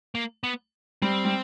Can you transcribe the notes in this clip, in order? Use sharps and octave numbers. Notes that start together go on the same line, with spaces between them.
A#3
B3
G3 C4
G3